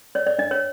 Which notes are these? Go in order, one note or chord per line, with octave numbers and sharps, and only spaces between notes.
C#5 D5
D5
D4 D#5
C#5